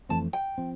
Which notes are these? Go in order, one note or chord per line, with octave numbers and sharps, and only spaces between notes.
F2 E3 A3 C4 A5
G5
F3 C4